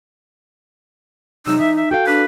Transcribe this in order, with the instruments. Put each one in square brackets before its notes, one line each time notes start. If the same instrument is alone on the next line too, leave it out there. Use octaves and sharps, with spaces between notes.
[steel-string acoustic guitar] C3 F#3 G#3 [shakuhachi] D#4 [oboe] E6
[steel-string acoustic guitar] E3 [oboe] E5
[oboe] E5
[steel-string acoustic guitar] F#4 A4 F5 [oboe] G5
[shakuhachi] D4 [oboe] B4